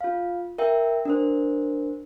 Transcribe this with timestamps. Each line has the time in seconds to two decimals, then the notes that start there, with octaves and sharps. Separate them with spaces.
0.01 F4 F5
0.58 A#4 E5 G5
1.05 D4 A#4 C5